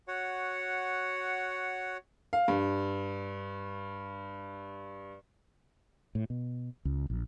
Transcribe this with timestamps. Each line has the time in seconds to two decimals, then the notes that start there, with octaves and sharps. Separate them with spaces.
0.08 F#4 C#5 F#5
2.33 F5
2.48 G2
6.15 A2
6.30 B2
6.85 C#2
7.10 A#1